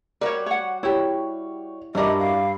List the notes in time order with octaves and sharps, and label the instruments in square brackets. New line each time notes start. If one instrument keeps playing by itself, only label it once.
[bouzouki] G3 F#4 [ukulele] A#4 C#5
[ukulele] C#5 F#5
[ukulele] E4 G4 [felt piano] C#5
[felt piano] G2 [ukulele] D4 A#4 [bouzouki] E4 F#4 D5 [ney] D#5
[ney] F5